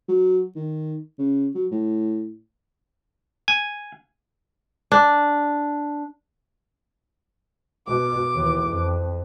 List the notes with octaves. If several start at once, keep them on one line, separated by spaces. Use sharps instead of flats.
F#3
D#3
C#3
F#3
A2
G#5
D4
B2 D6
D#2 E3
F2